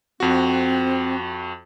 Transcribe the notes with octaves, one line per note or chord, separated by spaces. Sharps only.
F2 C4 F#4